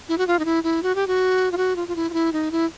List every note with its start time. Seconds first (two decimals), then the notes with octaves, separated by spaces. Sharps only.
0.09 E4
0.18 F#4
0.27 F4
0.39 D#4
0.45 E4
0.64 E4
0.83 F#4
0.95 G4
1.07 F#4
1.52 F4
1.57 F#4
1.76 F4
1.88 F4
1.96 E4
2.10 F4
2.13 E4
2.33 D#4
2.52 E4